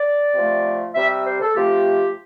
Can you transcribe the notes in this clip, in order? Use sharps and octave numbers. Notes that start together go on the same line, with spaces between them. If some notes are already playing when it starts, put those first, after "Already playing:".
Already playing: D5
C3 F3 A3
C3 G3 E5
E5
C5
A4
C3 F3 A3 G4